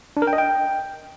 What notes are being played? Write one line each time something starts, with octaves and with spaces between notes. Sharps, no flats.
D4
A#4
G5
D#5
G5